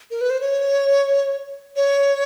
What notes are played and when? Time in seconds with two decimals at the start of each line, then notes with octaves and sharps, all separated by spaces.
0.11 A#4
0.21 B4
0.30 C5
0.41 C#5
1.76 C#5